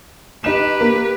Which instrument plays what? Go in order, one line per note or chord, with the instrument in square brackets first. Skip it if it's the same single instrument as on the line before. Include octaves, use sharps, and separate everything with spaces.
[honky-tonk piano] D#4 E7 [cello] G4 B4
[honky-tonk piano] A#3